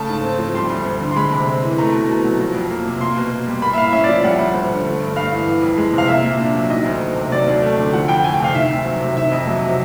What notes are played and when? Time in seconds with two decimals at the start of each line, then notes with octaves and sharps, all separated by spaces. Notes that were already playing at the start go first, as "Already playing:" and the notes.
Already playing: C#3 A3 A5
0.09 G#2
0.24 C4
0.39 F3
0.55 G3 C6
0.70 D2
0.85 D2
1.01 D3
1.11 C6
1.16 G#3 B5
1.32 C3
1.47 C4
1.63 E3
1.78 A3 A#5
1.93 B2
2.09 B2
2.24 F#3
2.40 F3
2.55 F2
2.70 A#3
2.85 C3
3.01 A#3 C6
3.17 B2
3.31 B2
3.47 G3
3.62 A#3 B5
3.73 E5
3.78 A2 F5
3.93 C#4 E5
4.04 D5
4.09 F3
4.24 G3 F#5
4.39 D2
4.55 D2
4.70 D3
4.86 A3
5.01 G2
5.16 G2 F5
5.32 E3
5.47 E3
5.63 F2
5.78 G#3
5.93 C3
5.98 F5
6.08 A#3 E5
6.24 A#2
6.40 D4
6.54 F#3
6.70 D#3 D#5
6.85 D2
7.01 D2
7.16 C3
7.32 F#3 D5
7.48 D#2
7.62 A3
7.78 D3
7.93 F3 F#5
8.08 F2 G5
8.24 A3 G#5
8.34 G5
8.40 C3 F5
8.55 D#3 E5
8.71 D2
8.85 F#3
9.00 C3
9.17 D#3 E5
9.32 F2 D#5
9.47 F#3
9.63 C3